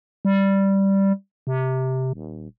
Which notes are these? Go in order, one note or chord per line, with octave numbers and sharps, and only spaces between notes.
G3
C3
D#1